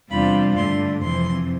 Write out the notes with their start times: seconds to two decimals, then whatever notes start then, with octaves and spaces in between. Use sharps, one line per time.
0.11 E2 C3 G3 D4 F4 B5
0.56 G2 D3 A3 C6
1.02 F2 C3 E3 C6